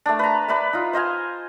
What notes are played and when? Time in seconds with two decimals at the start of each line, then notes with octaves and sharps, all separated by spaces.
0.06 A3 D4
0.19 B4 A#5
0.48 B4 D5 E5 A5
0.73 D#4 F4
0.93 C5 D#5 F5 G#5